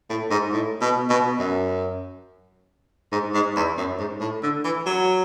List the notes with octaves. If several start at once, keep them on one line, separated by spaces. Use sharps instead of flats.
A2
G#2
A2
B2
B2
F#2
G#2
G#2
E2
F#2
G#2
A2
D3
E3
F#3